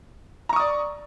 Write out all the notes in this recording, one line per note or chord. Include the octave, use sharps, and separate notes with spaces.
D5 A#5 C#6 D#6